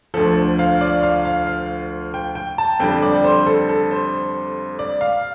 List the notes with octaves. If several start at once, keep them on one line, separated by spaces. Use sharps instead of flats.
D2 D3 F3 A4
F5
D5
F5
F5
F5
G5
G5
A5
F2 D3 G3 G5
D5
C5
A4
A4
C5
D5
F5